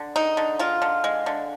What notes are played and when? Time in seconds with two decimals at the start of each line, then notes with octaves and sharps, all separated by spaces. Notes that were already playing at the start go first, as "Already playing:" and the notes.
Already playing: D3
0.16 G#3 D#4
0.37 D3
0.59 G#3 F4
0.82 D3
1.04 G#3
1.26 D3